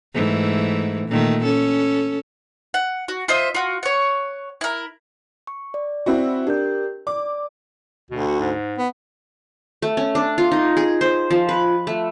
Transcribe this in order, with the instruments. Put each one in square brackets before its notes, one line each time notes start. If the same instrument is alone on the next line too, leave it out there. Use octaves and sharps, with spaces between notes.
[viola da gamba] G#2 E3 A3
A#2 D#3 A3
C#4 A4
[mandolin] F#5
F#4
F4 C5 D#5 E5
F4 F#4
C#5 F#5
E4 A#4
[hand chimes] C#6
D5
[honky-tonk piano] C4 E4 F#4
[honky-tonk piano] D4 [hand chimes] G4 A#4 G6
[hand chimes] D5 [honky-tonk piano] D6
[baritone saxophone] D2 [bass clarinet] B2
[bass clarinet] F#4
G#2
[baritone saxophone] B3
[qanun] A3
C#4
D4
F4
D#4
G#4
C5
F3
B4
A3